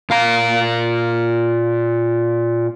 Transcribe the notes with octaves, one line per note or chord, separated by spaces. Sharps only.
A#2 F5 A#5